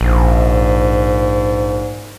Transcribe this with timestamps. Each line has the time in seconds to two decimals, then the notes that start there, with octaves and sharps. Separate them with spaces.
0.01 A#1 G#2